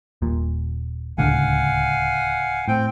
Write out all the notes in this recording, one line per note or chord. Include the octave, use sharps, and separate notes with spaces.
D#1 A#2
D1 C#2 D3 F5 F#5 G#5
A2 C4 G5